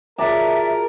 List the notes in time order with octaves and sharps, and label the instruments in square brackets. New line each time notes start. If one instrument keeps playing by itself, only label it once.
[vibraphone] F4 F#4 G#4 [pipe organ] A#4 [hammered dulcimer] D5 A5 A#5 [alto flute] E5